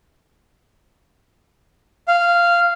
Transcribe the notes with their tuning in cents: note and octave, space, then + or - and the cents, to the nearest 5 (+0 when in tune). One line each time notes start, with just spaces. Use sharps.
F5 -10